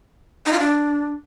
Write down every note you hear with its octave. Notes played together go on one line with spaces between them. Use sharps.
D#4
F4
D4